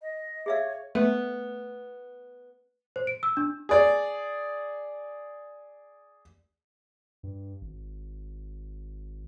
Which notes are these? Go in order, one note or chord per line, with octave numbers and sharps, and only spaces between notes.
D#5
G#4 C#5 E5 F5
A3 B3
C5
D7
E6
D4
G#4 D5
G2
G#1